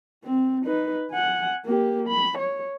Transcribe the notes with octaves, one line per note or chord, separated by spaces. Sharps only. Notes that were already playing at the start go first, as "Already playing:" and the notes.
C4
D#4 B4
F#5 G#5
A#3 G4
B5
C#5